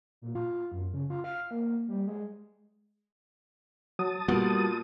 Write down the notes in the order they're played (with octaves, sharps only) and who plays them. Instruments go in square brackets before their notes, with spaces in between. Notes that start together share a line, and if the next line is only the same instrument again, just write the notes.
[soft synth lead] A#2
F4
F#2
C#3
F4
F5
A#3
G3
G#3
[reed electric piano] F#3 [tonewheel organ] A5 D#6
[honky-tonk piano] A#2 B3 [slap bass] G3 [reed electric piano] F#4